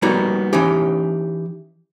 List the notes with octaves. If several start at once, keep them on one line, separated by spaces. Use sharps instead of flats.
G3 A#3 B3 D#4 F#4
E3 C#4 D#4 G4